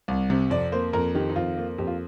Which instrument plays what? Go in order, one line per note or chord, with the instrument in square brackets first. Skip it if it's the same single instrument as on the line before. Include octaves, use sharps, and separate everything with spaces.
[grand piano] C2
C3
F2 D5
A#3 C5
F2 A#4
D#3 G4
D#4
F2 F4
A#3
F2 G4
F4